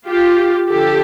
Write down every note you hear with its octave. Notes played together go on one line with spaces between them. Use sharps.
F4 G4
D3 F3 G4 A4